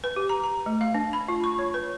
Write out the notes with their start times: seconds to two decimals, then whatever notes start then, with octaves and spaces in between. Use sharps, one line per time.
0.04 B4
0.16 G4
0.29 A#5
0.44 A#5
0.66 A3
0.81 F5
0.95 D4
1.13 B5
1.28 F4
1.44 C#6
1.59 C#5
1.74 B4